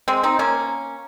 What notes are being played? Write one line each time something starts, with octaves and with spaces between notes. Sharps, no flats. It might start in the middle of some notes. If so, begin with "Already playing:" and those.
G#3 C4
C4 D#4
A#3 C#4